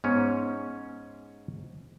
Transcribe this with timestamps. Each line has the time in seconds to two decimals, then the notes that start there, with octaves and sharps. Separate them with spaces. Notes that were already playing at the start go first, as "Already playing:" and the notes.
0.04 G#2 B3 C#4